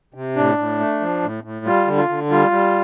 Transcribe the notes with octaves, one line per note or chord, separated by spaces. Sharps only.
C3
A2 D4
A2
A3
F3
A2
A2
G3 F4
D3
F4
D3
G3 F4
G3